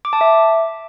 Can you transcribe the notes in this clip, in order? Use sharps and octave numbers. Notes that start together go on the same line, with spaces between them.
D6
A5
E5